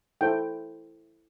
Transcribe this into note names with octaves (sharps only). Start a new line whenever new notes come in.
E4 A4 C5 G5